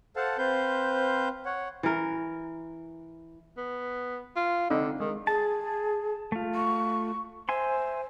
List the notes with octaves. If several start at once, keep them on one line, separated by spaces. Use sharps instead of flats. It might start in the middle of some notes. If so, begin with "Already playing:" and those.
A4 C5 F5 F#5 A5
C4 B4 C5 F5 G6
C#5 F#5
E3 A#4
B3
F4
D3 C4 D#4 D#5
D#3 G#3
G#4 A5
A3 F4
C#6
C5 E5 G#5 C6